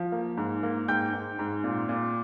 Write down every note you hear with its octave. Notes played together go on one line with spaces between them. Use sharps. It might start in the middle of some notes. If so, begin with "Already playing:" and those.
Already playing: F3
A#3
G#2
A#3
G#2 G5 G6
G#2
G#2
A#2
A#2